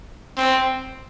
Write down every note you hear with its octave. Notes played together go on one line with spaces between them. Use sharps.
C4